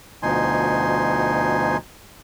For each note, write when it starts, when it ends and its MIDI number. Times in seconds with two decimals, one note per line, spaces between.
0.23 1.77 38
0.23 1.77 47
0.23 1.77 53
0.23 1.77 63
0.23 1.77 80
0.23 1.77 84